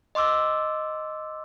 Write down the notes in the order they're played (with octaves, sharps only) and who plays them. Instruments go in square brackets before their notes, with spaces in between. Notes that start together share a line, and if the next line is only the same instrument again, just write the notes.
[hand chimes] D#5 C6 D6 E6